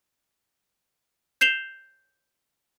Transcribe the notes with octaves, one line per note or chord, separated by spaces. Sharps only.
G6 C7 E7 F7 G7